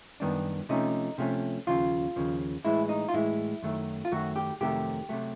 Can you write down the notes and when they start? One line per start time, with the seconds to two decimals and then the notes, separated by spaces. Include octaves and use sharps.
0.20 F#2 D#3 G3 B3 D4
0.69 C3 F3 A3 C#4 D#4
1.18 C3 F3 A3 C#4
1.67 D#2 C#3 F3 F4
2.16 D#2 C#3 F3
2.65 A2 E3 G#3 E4
2.89 D#4
3.09 F4
3.14 A2 E3 G#3 E4
3.62 F#2 D#3 F#3 A3
4.05 F4
4.12 F#2 D#3 F#3 A3 F#4
4.36 G4
4.61 F2 C3 D#3 F#3 A3 G4
5.09 C3 D#3 F#3 A3